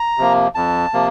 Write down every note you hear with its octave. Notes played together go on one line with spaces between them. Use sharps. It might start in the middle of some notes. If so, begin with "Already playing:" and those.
Already playing: A#5
C3 F3 A#3
F2 A5
C3 F3 A#3